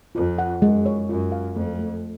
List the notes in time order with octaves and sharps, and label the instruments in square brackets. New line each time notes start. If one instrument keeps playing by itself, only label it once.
[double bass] F2 [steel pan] F4
[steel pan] F#5
[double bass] F#2 [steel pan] G#3
[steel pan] C#5
[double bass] F#2 [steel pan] F4
[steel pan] F5
[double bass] F2 [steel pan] A3
[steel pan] A3